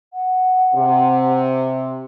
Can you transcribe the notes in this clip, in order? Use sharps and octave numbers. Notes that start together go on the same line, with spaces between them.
F#5
C3